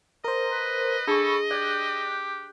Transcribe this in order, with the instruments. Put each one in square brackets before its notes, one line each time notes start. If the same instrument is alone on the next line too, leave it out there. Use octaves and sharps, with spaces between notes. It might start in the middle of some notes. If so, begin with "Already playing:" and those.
[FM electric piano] A#4 C5 [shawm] D#5
[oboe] B4
[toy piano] D4 G#4 A5 [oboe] A4 [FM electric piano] B5 C#6
[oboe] G4 [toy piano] D5 [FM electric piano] F#6 G6